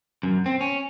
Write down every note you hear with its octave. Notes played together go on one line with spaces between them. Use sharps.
F#2
C4
C#4